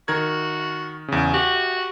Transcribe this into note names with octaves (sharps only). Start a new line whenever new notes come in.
D#3 F#4 A#4 G#6
E2 C#3
F#4 G4